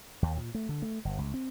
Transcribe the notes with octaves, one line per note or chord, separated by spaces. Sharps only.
D#2
A#2
A3
D3
A3
G1
C#2
C4